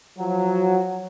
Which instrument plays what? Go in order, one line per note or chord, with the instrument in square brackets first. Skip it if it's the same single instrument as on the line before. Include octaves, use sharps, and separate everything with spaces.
[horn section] F3 F#3